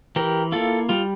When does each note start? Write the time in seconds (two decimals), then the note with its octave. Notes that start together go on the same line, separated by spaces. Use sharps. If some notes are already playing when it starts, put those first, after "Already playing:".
0.16 E3 G4 A#4
0.52 A#3 E4 F4 A4
0.89 G3 F4